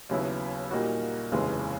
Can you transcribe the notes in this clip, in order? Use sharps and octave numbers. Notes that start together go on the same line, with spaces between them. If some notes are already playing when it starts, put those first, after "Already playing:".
D#2 C#3 F#3 B3 E4
A#2 G3 A#3 D#4 F#4
F1 D#2 C#3 E3 G#3